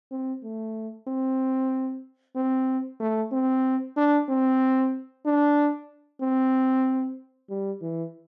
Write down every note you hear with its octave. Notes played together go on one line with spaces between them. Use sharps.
C4
A3
C4
C4
A3
C4
D4
C4
D4
C4
G3
E3